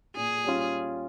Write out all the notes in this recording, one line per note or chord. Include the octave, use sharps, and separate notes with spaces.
A#2 G#4
G3 C#4 F4